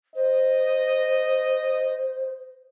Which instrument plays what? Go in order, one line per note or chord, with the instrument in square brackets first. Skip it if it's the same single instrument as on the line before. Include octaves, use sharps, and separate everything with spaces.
[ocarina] C5 [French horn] D#5